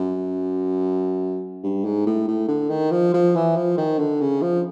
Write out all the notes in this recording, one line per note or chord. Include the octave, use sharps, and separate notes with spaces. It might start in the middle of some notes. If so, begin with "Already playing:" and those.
Already playing: F#2
G2
G#2
A2
A2
D3
D#3
F3
F3
E3
F3
D#3
D3
C#3
F3